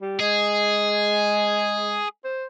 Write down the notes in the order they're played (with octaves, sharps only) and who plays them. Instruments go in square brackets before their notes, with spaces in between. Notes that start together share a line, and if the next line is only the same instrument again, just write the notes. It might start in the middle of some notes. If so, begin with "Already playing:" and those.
[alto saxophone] G3
[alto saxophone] G#3 [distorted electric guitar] G#4
[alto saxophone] C5